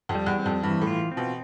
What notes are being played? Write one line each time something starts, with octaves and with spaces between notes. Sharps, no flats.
F2
G3
E2
C4
F2
G2 E3
A2
F4
C4
B2